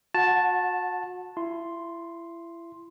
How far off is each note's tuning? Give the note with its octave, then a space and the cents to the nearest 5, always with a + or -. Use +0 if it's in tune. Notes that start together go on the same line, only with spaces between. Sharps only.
F#4 -35 F#5 -10 A5 +0
E4 +30 C6 +0